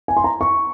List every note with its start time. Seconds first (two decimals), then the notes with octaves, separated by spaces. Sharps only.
0.08 G#5
0.17 C6
0.24 A#5
0.41 C#6